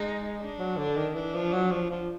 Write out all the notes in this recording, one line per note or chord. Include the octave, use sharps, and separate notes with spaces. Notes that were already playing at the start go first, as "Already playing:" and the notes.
Already playing: G#3 D#4
D4
F#3
D3
D#3
E3 D4
F3
F#3
F3
F3